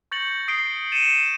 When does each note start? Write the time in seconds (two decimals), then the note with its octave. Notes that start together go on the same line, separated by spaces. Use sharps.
0.11 C#6 G6 A6 A#6 C#7 F#7
0.48 D#6 C7 D7 G7
0.92 A6 C#7 D#7 E7